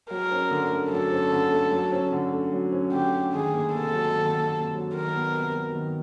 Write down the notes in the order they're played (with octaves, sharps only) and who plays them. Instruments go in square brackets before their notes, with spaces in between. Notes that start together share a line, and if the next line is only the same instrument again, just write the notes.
[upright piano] F#3 [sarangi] A#4
[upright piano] C#4
D3
A3
[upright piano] F#3 [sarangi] A4
[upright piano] C#4
D3
A3
F#3
C#4
D3
A3
F#3
C#4
[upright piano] D3 [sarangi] G4
[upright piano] A3
[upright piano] D#3 [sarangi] G#4
[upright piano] A#3
[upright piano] C3 [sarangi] A4
[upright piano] F#3
D#3
A#3
C3
F#3
[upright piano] D#3 [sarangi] A#4
[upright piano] B3
C3
F#3
D#3